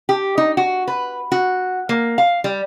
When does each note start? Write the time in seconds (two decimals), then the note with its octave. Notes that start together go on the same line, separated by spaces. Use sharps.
0.09 G4
0.38 D#4
0.57 F#4
0.88 B4
1.32 F#4
1.89 A#3
2.18 F5
2.44 G3